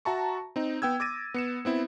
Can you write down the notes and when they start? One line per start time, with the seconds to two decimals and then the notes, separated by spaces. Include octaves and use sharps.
0.05 F#4 E5 A5 A#5 C#6
0.56 C4 D#4
0.82 B3 G5 E6 G#6
1.00 D6 E6 A6 A#6 D#7
1.34 B3 C#7 E7
1.65 B3 C4 E4